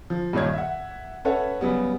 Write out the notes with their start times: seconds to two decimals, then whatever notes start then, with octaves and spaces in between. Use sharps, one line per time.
0.10 F3
0.33 G2 A#2 D#3 C#5 G#6
0.53 E5 F#5
1.25 C#4 A4 B4 C#5 E5 F#5
1.61 C#3 F#3 G3 B3